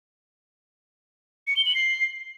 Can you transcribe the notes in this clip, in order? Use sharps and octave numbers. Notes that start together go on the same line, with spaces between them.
C#7
G7
F#7
C7